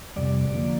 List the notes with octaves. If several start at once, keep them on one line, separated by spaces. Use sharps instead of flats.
F2 C3 G3 D5
D3 F3 A#3